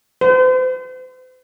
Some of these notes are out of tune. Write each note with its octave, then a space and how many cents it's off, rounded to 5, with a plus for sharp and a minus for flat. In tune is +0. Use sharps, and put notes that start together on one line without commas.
C5 -40